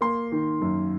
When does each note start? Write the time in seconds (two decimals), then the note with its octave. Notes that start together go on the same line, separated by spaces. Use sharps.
0.01 A#3 C6
0.32 D#3
0.62 F#2